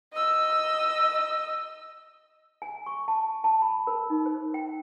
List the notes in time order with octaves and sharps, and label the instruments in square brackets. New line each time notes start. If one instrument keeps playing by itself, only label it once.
[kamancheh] D#5 E6
[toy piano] G#5
C#6
A5
A5
B5
A#4
D#4
C5
G5